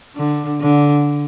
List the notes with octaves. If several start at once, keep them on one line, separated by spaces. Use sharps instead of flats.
D3
D3